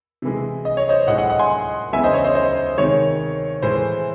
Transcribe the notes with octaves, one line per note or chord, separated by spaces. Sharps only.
C3 E3 G#3
D#5
C#5
C5 D#5
A2 G#3 D#5 F#5
D#5 F#5
D#5 F#5
G#5 C6
E2 C#3 E3 G#3 E5 G#5
C5 D#5
C#5
C5 D#5
C5 D#5
C3 D#3 G#3 C#5
A2 E3 G#3 C5